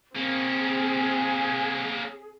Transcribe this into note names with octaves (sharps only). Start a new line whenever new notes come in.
A#3 C4 C#4 G#4